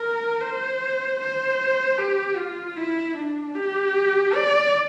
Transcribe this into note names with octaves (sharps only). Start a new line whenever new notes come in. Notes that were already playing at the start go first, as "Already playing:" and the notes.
Already playing: A#4
C5
C5
G4
F4
E4
D4
G4
D5